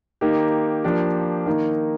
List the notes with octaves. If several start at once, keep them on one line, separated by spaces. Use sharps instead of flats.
D#3 A#3 D#4 G4
F3 A#3 D4 G4
D#3 A#3 D#4